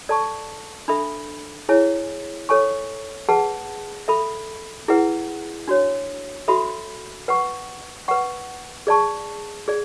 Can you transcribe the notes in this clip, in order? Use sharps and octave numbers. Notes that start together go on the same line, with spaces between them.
A4 D5 A5 C#6
D4 A4 E5 B5
E4 G#4 C#5 G#5
A4 C#5 G#5 C#6
G#4 B4 F#5 A5
A4 E5 B5
E4 G#4 B4 F#5
D4 F#4 C#5
F#4 A4 E5 B5
B4 F#5 C#6
B4 F#5 C#6
G#4 D5 A5 C#6
G#4 D5